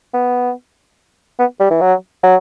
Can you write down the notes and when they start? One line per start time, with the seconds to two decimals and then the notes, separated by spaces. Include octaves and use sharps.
0.14 B3
1.39 B3
1.60 G3
1.70 E3
1.81 F#3
2.23 F#3